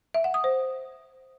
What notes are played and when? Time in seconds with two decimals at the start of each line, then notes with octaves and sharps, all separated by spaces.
0.14 E5
0.24 F#5
0.34 D#6
0.44 C5